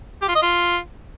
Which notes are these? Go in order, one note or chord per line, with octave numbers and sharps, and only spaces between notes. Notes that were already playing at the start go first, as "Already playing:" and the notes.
G4
F4
D#5
F4